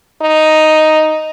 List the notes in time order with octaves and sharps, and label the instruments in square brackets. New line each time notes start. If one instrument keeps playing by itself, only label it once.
[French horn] D#4